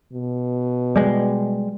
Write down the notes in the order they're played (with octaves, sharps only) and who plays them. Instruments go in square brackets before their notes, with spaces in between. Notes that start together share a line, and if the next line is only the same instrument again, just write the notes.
[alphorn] B2
[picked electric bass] G3 G#3